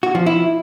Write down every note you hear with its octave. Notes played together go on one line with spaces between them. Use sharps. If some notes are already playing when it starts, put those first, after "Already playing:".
F#4
F3
E4